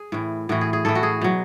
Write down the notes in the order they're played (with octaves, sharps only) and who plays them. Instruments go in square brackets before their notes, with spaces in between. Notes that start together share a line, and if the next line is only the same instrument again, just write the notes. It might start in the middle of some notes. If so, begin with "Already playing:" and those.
Already playing: [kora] G#4
A2 E3
A2 E3 F#4
G#4
G#4
A2 E3 A4
F#4
G#4
B2 F#3